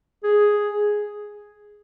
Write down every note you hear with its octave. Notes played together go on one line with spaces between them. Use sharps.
G#4